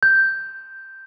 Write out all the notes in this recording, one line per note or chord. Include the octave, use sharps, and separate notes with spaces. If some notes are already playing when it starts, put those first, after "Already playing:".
G6